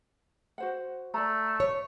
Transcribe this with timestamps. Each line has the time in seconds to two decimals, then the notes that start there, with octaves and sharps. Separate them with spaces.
0.58 F#4 C5 F#5
1.14 A3 D5 A#5
1.60 C#5